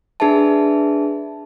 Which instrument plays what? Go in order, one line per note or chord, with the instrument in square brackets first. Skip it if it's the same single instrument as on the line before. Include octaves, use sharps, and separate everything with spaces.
[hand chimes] D4 G#4 B4 E5 A5